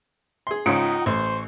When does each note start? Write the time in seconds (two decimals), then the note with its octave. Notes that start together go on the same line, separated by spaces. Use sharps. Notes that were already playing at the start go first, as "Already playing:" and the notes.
0.47 G#4 C6
0.66 G#2 C#3 D#4 F4 F#5 G5
1.06 A1 C5 C#6